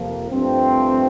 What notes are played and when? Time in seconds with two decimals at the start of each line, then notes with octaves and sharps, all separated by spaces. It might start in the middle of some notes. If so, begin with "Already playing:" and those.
Already playing: F2 C3 F3 A#3
0.30 G2 F3 A3 C4